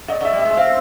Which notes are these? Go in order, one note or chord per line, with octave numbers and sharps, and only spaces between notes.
C#3 D#5
C#3 E5
G3
E5
G#3
E5
C4 F5